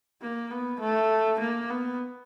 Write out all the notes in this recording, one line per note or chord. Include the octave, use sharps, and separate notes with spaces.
A#3
B3
A3
A#3
B3